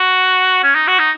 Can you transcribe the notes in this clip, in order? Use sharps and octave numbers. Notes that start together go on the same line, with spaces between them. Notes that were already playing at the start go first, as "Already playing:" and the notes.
Already playing: F#4
C#4
D#4
F#4
D#4